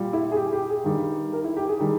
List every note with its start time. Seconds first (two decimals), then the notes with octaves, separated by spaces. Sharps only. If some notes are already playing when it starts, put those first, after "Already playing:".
Already playing: A#2 G3
0.13 E4
0.32 G#4
0.36 G4
0.53 G4
0.69 G#4
0.84 G2 D#3 G3
1.33 A#4
1.44 E4
1.57 G4
1.68 G#4
1.80 D#3 G3